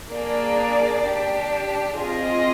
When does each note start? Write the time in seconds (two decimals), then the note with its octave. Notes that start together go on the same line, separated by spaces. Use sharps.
0.12 A#3 D4 G#4 D5
1.05 D4 G4
1.99 C4 F4 G#4 D#5